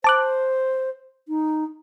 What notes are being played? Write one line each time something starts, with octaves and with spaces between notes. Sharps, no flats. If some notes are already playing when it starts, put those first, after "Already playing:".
C5 A5 D6 F#6
D#4